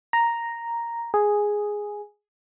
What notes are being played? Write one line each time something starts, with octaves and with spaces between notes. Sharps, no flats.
A#5
G#4